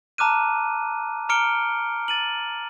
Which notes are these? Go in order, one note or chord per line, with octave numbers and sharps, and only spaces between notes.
A5 A#5 D6 F6 F#6 D#7
A#5 D6 F6 C#7 D7 G7
A6 D#7 F#7